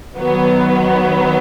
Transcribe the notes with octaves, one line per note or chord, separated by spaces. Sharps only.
D#3 F#3 B3